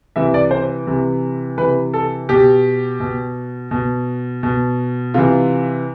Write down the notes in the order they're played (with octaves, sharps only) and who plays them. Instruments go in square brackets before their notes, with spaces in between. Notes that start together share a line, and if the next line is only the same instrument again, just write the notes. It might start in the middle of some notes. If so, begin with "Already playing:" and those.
[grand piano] C3 E3 E5
D5
C5
C3 E3
C3 E3 B4
A4
B2 G4
B2
B2
B2
C3 E3 F4